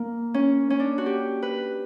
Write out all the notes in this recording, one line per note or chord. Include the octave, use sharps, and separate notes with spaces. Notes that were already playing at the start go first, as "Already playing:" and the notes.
Already playing: A#3
C#4
C#4
D4
F#4
G4
B4